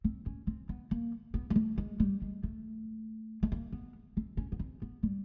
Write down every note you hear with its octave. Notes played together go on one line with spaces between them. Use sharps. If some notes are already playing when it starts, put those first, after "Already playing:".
C4
C#4
C4
B3
A#3
B3
G#3
A3
G#3
G3
G#3
A3
A3
A#3
B3
C4
C#4
B3
C4
B3
G3